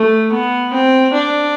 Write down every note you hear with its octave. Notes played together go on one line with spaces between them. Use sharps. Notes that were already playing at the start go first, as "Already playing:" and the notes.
Already playing: A3
B3
C4
D4